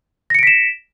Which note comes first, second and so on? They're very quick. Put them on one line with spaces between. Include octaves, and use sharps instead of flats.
A#6 C#7 D7 B6 E7